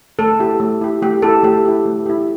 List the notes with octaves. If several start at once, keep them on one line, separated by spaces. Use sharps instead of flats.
A3 A4
E4 G4
A3
E4 G4
A3 G4
E4 G4 A4
A3 G4
E4 G4
A3
E4 G4